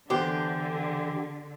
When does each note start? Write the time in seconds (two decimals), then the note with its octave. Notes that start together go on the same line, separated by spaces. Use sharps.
0.10 E2 D3 G4 C5